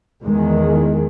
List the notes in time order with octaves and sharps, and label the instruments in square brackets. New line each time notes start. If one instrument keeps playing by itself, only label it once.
[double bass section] E2 D#3 G#3